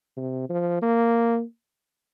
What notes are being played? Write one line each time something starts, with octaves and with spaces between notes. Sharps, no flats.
C3
F3
A#3